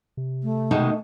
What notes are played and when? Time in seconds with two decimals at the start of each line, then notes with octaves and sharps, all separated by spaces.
0.17 C3
0.43 A3
0.71 B2 D#3 G#3 D#4